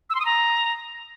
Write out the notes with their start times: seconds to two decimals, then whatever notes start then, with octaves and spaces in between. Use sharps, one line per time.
0.10 E6
0.15 C6
0.20 D#6
0.25 A#5